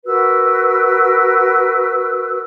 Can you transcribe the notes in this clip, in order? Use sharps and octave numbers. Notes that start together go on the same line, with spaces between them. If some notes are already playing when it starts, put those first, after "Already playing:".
F#4 A#4 B4 E6